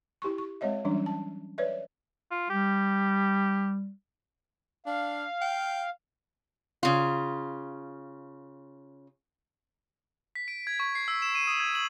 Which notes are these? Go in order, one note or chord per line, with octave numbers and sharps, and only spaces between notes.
E4 G4 C6 C#6
C#6
G#3 C4 C#5 D#5 E5
E3 F#3 G3 C#4 D4
A5
B4 C#5 D5 E5
F4
G3 G4
D4 F5
G5
C#3 F4
B6
D7
G#6
C#6
C7
E6
E7
D#7
D#6
G#6
F#7